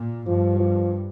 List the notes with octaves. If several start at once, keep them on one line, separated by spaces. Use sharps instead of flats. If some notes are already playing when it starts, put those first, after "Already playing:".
Already playing: A#2
G2 F3
F3